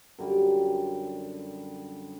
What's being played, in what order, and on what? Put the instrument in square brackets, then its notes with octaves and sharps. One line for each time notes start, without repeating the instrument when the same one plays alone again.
[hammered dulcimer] F#2 D3 G3